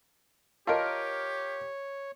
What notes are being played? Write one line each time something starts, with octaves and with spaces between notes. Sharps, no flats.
F4 G4 A#4 C#5 D#5 A5